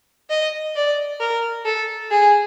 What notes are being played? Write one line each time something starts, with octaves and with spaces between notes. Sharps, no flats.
D#5
D5
A#4
A4
G#4